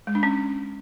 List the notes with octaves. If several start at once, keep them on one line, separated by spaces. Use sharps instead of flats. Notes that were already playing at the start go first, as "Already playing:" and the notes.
G#3
D4
C#4